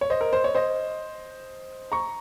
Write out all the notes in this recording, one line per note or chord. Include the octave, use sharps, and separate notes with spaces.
C#5
C5 D#5
A#4
C5
C#5
C5 D#5
A#5 C#6